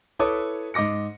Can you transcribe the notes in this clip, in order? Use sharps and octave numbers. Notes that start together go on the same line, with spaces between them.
E4 A4 B4 C#5 D6 D#6
G#2 D#5 D6 A#6 C#7